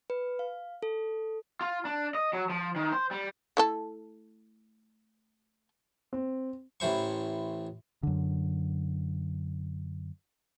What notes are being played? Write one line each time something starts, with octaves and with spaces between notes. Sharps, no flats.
B4
F5
A4
F4
D4
D#5
F#3
F3
D#3
C5
G3
A3 E4 A4
C4
A1 A2 E3 C5 C#6
F#2 D3